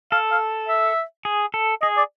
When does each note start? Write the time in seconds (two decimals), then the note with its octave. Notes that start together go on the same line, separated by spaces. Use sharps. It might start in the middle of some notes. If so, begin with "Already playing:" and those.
0.12 A4 F5
0.31 F5
0.68 E5
1.25 G#4
1.54 A4
1.82 G#4 D#5
1.97 D5